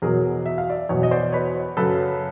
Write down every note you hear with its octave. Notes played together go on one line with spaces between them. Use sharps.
E2 B2 F#3 G#4 A#4
E5
F5
D5 E5
E2 B2 F#3 C#5 D#5
D#5
C5 D5
B4 C#5
F#2 C#3 F#3 A4 B4